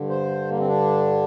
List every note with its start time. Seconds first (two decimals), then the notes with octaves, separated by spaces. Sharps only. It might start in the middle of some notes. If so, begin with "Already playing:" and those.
Already playing: G2 D3
0.09 C5
0.50 A#3
0.59 C4
0.67 D4